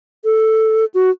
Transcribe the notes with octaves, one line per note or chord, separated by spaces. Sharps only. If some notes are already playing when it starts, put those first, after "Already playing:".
A4
F#4